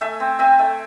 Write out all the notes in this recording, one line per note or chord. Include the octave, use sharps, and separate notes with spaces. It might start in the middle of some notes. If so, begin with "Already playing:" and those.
A3 E5 G#5
C4
C4 E5 G#5
A3